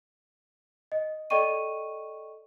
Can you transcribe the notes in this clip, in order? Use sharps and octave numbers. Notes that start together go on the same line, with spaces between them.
D#5
A4 D5 D#5 G5 C#6 D#7